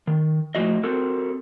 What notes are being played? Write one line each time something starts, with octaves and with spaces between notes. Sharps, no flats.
D#3
A2 F3 F#4 D#5
C4 F#4 A4 A#4